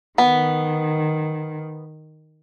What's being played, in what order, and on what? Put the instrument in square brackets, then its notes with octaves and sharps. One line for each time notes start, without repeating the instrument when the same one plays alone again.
[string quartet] D#3 [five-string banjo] B3